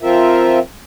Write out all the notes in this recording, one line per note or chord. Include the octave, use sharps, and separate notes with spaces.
F3 C4 F4 A#4 E5